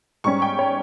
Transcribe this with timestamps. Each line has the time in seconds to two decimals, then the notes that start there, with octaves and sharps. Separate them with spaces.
0.24 G#2 G3 C#4 C#6
0.42 G5
0.59 C#5